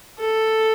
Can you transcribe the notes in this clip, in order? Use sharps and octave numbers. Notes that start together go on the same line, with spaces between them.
A4